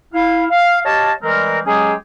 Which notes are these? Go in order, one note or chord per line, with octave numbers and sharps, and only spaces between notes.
E4 F5
F5
G4 C#5 D#5 F5 A5
E3 G3 G#3 C4 A#4
F#3 G#3 C#4 G4 G#4